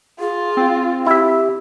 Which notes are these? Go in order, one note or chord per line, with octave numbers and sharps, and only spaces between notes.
F4 G#4
C4
E4 G4 E5